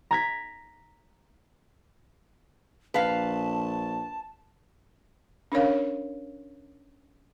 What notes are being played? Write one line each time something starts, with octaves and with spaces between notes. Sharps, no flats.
A#5 G#6 B6
A#1 B4 F5 A5
C#4 D4 A#4 C#5 F5